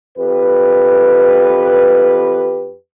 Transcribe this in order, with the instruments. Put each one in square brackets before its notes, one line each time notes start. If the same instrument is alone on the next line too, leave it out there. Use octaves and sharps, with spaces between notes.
[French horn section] F2 G4 B4